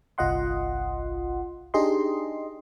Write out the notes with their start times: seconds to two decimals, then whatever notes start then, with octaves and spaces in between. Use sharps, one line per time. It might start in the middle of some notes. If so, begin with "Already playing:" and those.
0.18 G1 C2 F4 D#5 F#5 C6
1.74 D4 D#4 G4 G#4 D#5 C6